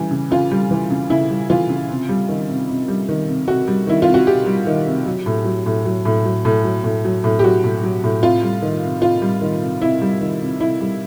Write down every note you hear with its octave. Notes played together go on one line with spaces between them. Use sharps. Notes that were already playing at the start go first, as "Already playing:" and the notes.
Already playing: C#3 E3 G3
C#3
C#3 F4
G3
E3
C#3
C#3 E4
G3
E3 F4
C#3
C3
G3
D#3
C3
C3
G3
D#3
C3
C3 F#4
G3
D#3 E4
F4
C3
F#4
C3 G4
G3
D#3
C3
F#3
A2
F#3
A2
F#3
A2
F#3
A2
F#3
A2
F#3
A2
G4
F#3 F#4
A2
F#3
A2
C3 F4
G3
D#3
C3
C3 F4
G3
D#3
C3
C3 E4
G3
D#3
C3
C3 E4
G3